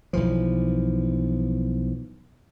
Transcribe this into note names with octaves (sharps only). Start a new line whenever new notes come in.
B1 E3 F3